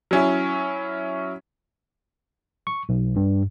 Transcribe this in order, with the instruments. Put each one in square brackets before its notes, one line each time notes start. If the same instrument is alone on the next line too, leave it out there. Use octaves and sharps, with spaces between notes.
[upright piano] F#3 C#4 E4
[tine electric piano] C#6
B1
G2